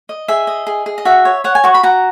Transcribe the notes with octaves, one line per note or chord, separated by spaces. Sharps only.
D#5
G#4 E5
D#5
G#4
G#4
D#5
F#4 E5
C#5
C#5 F#5
G#5
F#4 C#6
B5
F#4 A#5